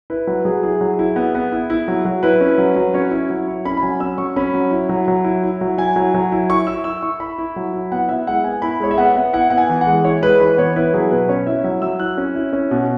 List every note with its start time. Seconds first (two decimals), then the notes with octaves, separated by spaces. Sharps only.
0.10 E4 B4
0.27 F#3 B4
0.45 F#3 G#4
0.63 E4 G#4
0.81 F#3
0.99 E4
1.16 B3
1.35 B3
1.52 E4
1.70 E4
1.88 F#3
2.05 F#3
2.23 E4 B4
2.41 C#4
2.58 F#3
2.76 F#3
2.94 C#4 C#5
3.11 E4
3.30 F#3
3.48 E4
3.65 C#4 B5
3.77 B5
3.82 F#3 G#5
4.00 C#4 E6
4.18 F#3 C#6
4.36 C#4 B5
4.54 F#3
4.71 E4
4.89 F#3
5.08 F#3
5.24 E4
5.43 E4
5.61 F#3
5.78 E4 G#5
5.96 F#3
6.14 F#3
6.32 E4
6.50 E4 C#6
6.67 E4 E6
6.84 E4 E6
7.02 E4 C#6
7.20 E4 B5
7.38 E4
7.56 F#3
7.73 E4
7.92 B3 F#5
8.09 E4 E5
8.27 G#3 F#5
8.44 B3 G#5
8.62 E4 B5
8.80 G#3 C#5
8.91 E5
8.98 B3 F#5
9.16 B3
9.33 E4 F#5
9.50 B3 F#5
9.58 G#5
9.69 E3
9.81 F#5
9.87 G#3
10.04 E4 C#5
10.22 G#3 B4
10.40 E3 B4
10.57 B3 C#5
10.76 E4 B4
10.93 F#3 G#4
11.11 B2 B4
11.29 C#4 C#5
11.47 E4 E5
11.64 F#3 E5
11.82 F#3 E6
12.00 E4 F#6
12.17 C#4
12.35 E4
12.53 C#4
12.71 B2